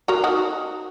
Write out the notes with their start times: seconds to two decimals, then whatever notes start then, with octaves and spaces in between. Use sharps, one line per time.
0.08 F#4 A#4
0.24 D#4 F#4